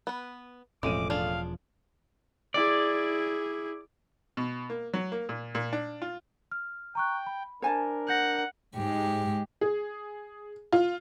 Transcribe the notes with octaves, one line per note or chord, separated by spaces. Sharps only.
B3 B4
E1 A1 F3 G#3 A3 C4 D6 D#7
D4 F4 G#4 F5
E4 G#4 D5
B2
A#3
F#3
A#3
A#2
A#2
D4
F4
F6
G5 A#5 C#6 F#6
B5
D4 A#4 C5 G#5 A5
F#5 G6 A#6
G#2 G#3 G4
G#4
F4